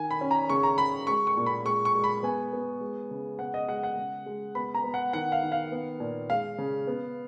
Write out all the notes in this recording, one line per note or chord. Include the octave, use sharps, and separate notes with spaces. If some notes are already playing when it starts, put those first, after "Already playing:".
Already playing: D#3 G#5
B5
C#4
A#5
C#3 C#6
A#5
C#3 B5
G#3 C#6
C#6
A#2
B5
G#3 C#6
C#6
G#3
B5
B3 G#5
B3
G#3
C#3
B3 F#5
D#5
G#3 F#5
F#5
C#3
G#3
B3 B5
A#5
B3
F#5
D#3 F#5
F5
D#3
F5
B3
A#2
G#3 F5
C#3
B3